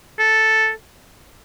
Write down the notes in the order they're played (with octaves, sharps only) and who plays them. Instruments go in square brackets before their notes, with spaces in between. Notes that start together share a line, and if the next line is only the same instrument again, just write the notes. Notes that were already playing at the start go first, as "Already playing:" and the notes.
[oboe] A4